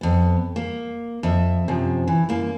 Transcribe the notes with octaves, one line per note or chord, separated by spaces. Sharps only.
F2 B3
A#3
F2 E5
F#2 C3 F3
E3
F#2 A#3